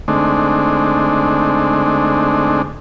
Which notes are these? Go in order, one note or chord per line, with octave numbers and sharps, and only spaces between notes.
D3 G#3 A3 C4 D4 D#4